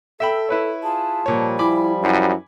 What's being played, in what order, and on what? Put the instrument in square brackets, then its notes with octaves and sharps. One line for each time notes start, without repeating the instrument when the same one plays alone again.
[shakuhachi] A4 [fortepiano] E5 G5 B5
[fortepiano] E4 B4 C#5
[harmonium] F4 G#4 [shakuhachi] A5
[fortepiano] A#2 C#5 [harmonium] F3 G3
[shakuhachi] E4 [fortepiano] G#5 B5 D6
[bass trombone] F#2 [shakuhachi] E4